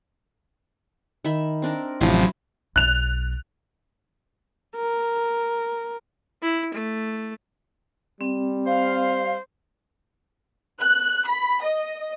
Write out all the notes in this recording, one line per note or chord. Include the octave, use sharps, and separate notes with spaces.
D#3 E5 B5
C4 D4 A#4
A1 C3 F3 F#3 E4 C6
B1 F#6 F7
A#4
E4
A3
G3 C4
C5 F5
F#6
B5
D#5